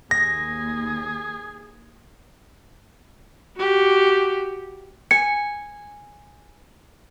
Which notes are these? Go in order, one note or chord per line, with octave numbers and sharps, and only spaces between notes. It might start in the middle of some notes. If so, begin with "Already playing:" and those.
D#2 G#4 A#6
F#4 G4
G#5 C#7